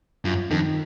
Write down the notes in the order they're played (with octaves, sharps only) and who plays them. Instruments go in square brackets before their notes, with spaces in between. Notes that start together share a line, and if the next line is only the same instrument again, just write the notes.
[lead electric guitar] F#2 [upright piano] F4
[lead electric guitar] F2 [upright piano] D#3